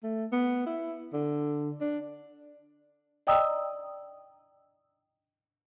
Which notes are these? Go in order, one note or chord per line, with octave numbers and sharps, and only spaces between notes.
A3
B3
E4
D3
D4
D5 D#5 G5 A#5 D#6 E6